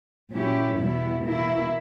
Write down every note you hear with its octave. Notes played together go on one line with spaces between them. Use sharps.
A#2 F#3 C#4 E4 G4
E2 B2 G3 B3 E4
B2 A#3 E4